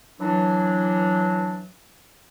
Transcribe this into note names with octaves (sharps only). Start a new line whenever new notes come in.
E3 F#3 D4